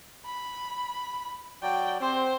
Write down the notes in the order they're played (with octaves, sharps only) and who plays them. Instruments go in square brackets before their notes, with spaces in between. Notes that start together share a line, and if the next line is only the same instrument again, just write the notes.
[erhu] B5
[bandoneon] F#3 F#4 D5 [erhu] G5
[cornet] C4 [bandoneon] G4 C6 [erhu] C5